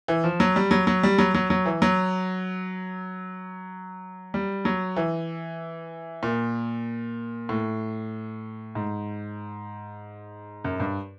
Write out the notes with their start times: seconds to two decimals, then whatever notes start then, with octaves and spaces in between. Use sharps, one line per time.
0.08 E3
0.24 F3
0.40 F#3
0.56 G3
0.71 F#3
0.87 F#3
1.03 G3
1.18 F#3
1.34 F#3
1.50 F#3
1.66 E3
1.82 F#3
4.34 G3
4.65 F#3
4.96 E3
6.23 A#2
7.49 A2
8.75 G#2
10.64 F#2
10.80 G2